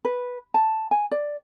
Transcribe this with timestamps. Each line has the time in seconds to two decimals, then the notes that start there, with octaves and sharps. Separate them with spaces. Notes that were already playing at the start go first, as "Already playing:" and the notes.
0.05 B4
0.54 A5
0.91 G#5
1.11 D5